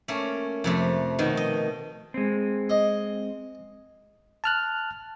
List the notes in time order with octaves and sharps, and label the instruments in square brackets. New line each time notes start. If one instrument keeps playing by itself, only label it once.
[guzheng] A3 A#3 C#4
F2 C3 A3
B2 D#3
D#5
[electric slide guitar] G#3 C4
[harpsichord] D#5
[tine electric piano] A5 F6 F#6